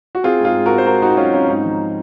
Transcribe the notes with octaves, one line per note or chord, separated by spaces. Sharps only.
F#4
C4 F4 G#4
G#2
F4 G#4
G#2
F#4 A#4
C4
C5
G#2 F#4 A#4
C4 D#4 F#4
F#3 C#4 F4
C4 C#4 F4
G#2 D#4
F3